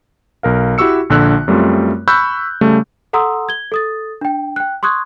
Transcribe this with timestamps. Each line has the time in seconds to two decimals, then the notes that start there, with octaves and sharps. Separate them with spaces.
0.43 B1 A#4 F5
0.78 E4 F#4 G4 C#6 E6 C#7
1.10 A#1 D3 E6 F#6
1.48 F#2 G3 A3 C4 F4
2.08 B5 C#6 E6 F#6 G6
2.61 C#3 G3 A3
3.13 A4 F#5 A#5 C6 D#6 E6
3.49 G#6 G7
3.72 A4 D#6 A6
4.21 D4 G5
4.56 G5 F#6
4.83 C6 C#6 D#6 F#6 G#6